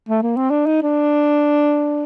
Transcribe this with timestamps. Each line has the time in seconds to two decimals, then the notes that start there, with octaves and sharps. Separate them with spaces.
0.09 A3
0.22 A#3
0.37 C4
0.51 D4
0.66 D#4
0.83 D4